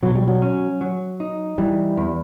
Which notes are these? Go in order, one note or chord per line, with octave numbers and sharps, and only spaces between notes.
B2 F#3
G3
F#3
C#4
F#3
D#4
E3 G3
E2